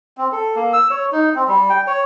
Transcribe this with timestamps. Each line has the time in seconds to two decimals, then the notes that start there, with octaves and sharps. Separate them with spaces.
0.18 C4
0.32 A4
0.56 A#3
0.73 E6
0.90 C#5
1.12 D#4
1.35 C4
1.48 G3
1.69 G5
1.87 C#5